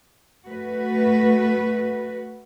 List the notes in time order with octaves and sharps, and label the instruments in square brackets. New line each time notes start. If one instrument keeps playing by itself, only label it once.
[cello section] A3 F#4 B4